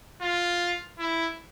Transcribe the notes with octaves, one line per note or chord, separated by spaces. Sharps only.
F4
E4